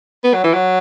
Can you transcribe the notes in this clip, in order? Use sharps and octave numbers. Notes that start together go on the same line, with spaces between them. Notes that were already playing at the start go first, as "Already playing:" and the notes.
B3
F#3
E3
F#3